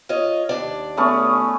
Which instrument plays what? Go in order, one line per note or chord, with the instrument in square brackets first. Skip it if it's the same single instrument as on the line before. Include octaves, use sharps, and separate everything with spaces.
[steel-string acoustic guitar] F4 C#5 D#5
D#2 D4 D5
[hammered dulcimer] A3 B3 C#4